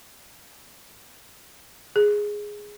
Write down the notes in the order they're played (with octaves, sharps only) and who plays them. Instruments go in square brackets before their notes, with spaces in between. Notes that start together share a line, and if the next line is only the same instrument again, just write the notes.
[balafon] G#4